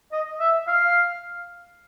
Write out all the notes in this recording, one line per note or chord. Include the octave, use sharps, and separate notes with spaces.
D#5
E5
F5